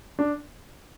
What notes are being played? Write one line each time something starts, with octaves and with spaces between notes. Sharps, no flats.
D4